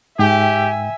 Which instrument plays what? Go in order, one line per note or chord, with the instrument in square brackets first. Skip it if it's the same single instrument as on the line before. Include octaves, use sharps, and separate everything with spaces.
[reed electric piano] G#2 G5 [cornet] G4 [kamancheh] E5 [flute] G#5